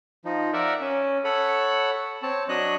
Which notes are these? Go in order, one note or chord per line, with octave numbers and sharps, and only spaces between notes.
F3 D#4
A#4 D5 E5 F#5
C#4
A4 C#5 F#5 B5
C4 C#5 A5
F#3 D4 C#5 D#5 F#6